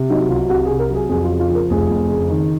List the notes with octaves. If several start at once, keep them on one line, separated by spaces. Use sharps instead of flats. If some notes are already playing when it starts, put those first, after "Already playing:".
Already playing: C3
F#3 D#4
C2 F4
C2 F#4
G#4
C3
A#4
F#3 G#4
F2 G#4
F4
C#3
F4
F3
A#4
F1 G#4
F2
C#3
D#3